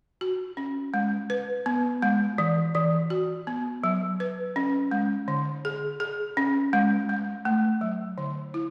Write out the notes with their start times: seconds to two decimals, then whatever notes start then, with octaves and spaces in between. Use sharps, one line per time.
0.21 F#4
0.57 C#4
0.94 G#3
1.30 B4
1.66 B3
2.02 G#3
2.38 E3
2.75 E3
3.10 F#4
3.47 B3
3.84 F#3
4.20 B4
4.56 C#4
4.91 G#3
5.28 D3
5.65 G#4
6.00 G#4
6.37 C#4
6.73 G#3
7.09 G#3
7.45 A3
7.81 F#3
8.18 D3
8.54 E4